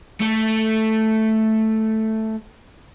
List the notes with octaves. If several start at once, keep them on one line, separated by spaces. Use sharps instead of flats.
A3 A4